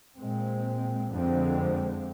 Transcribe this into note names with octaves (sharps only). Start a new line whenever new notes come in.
A#2 G#3 C4
F2 D3 F3 G#3 C4